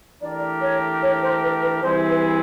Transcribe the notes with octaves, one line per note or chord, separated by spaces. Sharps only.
E3 A3 D4 G4 A#4 D5
C#5
C#5
C5
B4
B4
E3 G3 C4 E4 G#4 C5
B4